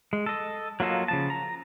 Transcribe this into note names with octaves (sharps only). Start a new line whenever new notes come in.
G#3
A4 D#5
F#3 A#3 F4 A4 D#5
C#3 F3 A5
A#5